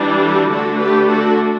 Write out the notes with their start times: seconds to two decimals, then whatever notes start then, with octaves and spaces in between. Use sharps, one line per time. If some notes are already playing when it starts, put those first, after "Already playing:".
Already playing: E3 G3 D4
0.21 F#4 A4
0.50 D3 A3 D4 F#4 A4
0.79 G4 B4
1.09 F#4 A4